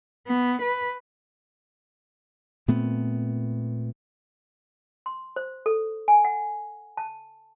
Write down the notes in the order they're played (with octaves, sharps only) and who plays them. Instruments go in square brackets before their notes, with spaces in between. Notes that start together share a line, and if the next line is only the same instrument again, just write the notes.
[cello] B3
B4
[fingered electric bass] A#2 A3 B3 C4
[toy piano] C6
C5
A4
G#5
F#5
A5